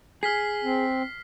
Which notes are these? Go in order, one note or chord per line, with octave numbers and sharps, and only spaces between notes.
G#4 F6 B6 C7
C4